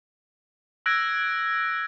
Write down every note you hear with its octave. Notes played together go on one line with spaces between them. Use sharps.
E6 F#6 G#6 A#6 D7